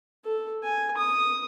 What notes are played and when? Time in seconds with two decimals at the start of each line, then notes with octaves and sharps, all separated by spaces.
0.24 A4
0.63 G#5
0.97 D#6